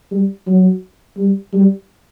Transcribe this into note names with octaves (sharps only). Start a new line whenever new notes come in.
G3
F#3
G3
G3